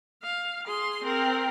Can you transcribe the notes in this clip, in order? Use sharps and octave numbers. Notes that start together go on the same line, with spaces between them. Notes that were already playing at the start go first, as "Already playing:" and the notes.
F5
G#4 C6
C4 A#4